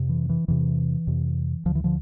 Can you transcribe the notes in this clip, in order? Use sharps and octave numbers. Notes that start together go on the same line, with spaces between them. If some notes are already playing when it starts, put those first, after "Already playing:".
Already playing: F2 C3
E3
E3
E2 C3 E3
F2 C3
D2 D3 F3
E3
D3 F3